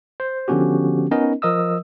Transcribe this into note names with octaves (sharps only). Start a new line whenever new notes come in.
C5
D3 F3 B3 C#4 F#4 G4
B3 C#4 D#4 A#4 D#5
F3 A#4 D#5 D#6 E6